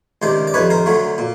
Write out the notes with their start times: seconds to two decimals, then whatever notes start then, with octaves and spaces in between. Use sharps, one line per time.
0.22 C#2 C3 D#3 C5 D5
0.47 D5
0.54 F2 C3 D#3 B4 C#5
0.70 A#4 C5
0.86 D2 D3 F#3 A3
1.18 A#2